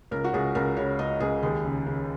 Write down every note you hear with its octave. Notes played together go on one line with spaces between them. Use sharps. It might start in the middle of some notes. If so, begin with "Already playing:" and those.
C#2 A#4
F#4
C#2 G#4
C#2 A#4
C#3 C#5
C#2 D#5
C#2 G#4
D#2 G#4
C#3
C#3